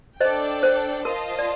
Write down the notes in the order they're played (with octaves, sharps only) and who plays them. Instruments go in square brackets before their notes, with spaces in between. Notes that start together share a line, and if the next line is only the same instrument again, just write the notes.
[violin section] D4 A4 D5 G5 [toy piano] C5 D#5
[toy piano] C5
[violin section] F4 C5 D#5 A5 [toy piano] A#4
[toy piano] D5